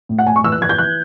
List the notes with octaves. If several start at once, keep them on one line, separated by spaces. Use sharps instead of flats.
A2
F#5
A2 G#5
C#6
E3 E6
F#6
E3 G#6
G6
E3 F#6